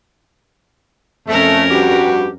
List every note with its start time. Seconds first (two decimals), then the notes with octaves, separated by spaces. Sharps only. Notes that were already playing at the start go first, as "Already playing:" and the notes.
1.28 F2 A3 C#4 A#4
1.71 G2 F#4 G4